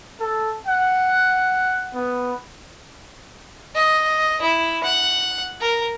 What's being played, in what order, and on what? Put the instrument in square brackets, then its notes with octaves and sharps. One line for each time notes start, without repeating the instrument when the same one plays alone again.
[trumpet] A4
F#5
B3
[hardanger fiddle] D#5
E4
F#5
A#4